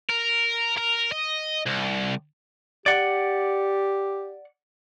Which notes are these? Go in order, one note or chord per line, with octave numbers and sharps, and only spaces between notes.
A#4
A#4
D#5
C2
G4 D5 F#5